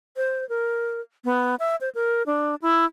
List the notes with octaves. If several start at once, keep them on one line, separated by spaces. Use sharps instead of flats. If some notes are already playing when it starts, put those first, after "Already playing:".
C5
A#4
B3
E5
C5
A#4
D4
E4